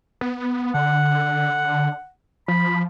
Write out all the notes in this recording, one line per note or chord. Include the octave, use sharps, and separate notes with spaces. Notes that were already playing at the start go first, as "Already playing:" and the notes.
B3
D3 F#5
F3 B5